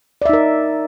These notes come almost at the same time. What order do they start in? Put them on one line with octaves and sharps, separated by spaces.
D5 E5 D#4 A#4